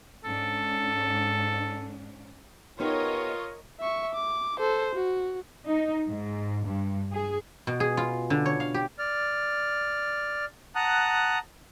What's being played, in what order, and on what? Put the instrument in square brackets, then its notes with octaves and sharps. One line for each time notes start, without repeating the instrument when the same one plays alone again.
[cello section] G#2 C#4 D4 [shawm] A4
[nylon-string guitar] B3 D#4 G4 [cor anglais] F4 [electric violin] A#4 [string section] C#5 D#5
[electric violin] E5 C#6
D6
A4 C5
F#4
[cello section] D#4
G#2
G2
G#4
[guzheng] B2
G#4
F4
D3
C#5
F5
G4
[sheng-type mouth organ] D5 F6
F#5 A5 A#5 D#6 F#6